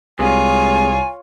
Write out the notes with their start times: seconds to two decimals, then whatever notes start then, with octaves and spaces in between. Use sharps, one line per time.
0.19 C2 C3 G#3 F4 C#5 G#5